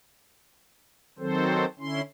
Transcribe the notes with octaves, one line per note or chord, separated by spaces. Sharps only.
D#3 F#3 C4 A4 C5
D3 C#4 E4 C6